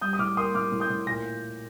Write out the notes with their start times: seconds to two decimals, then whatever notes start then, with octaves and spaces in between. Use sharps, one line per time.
0.01 G3 D#6 G6
0.13 D#6
0.18 A2 D6 F6
0.37 A#3 C6 D#6
0.55 A2 D6 F6
0.72 A2
0.80 D#6 G6
0.90 A2
1.07 A#2 A#6